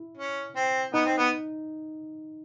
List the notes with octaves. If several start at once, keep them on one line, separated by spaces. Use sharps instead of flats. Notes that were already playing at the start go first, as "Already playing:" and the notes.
Already playing: E4
C#4
C4
B3 D#4
C4
B3